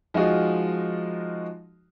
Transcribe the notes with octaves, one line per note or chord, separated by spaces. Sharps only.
F3 G#3 D#4 F4 F#4